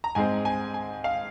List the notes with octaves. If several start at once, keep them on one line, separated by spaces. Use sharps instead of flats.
A#5
G#2 G#3 C4 G#5
G#5
G#5
F5